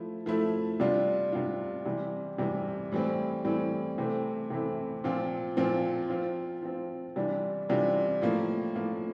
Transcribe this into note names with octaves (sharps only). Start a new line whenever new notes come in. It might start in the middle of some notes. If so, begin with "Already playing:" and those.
Already playing: F3 A3 E4
F3 A3 E4
C3 G3 D4 F4
C3 G3 D4 F4
C3 E3 G3
C3 E3 G3
A2 E3 G3 C4
A2 E3 G3 C4
C3 E3 A3 C4 E4
C3 E3 A3 C4 E4
A#2 F3 C4 F4
A#2 F3 C4 F4
F3 C4 F4
F3 C4 F4
C3 E3 G3 D4 F4
C3 E3 G3 D4 F4
A2 F3 A#3
A2 F3 A#3